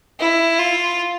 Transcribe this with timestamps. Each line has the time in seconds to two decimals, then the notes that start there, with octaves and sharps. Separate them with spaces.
0.20 E4
0.59 F4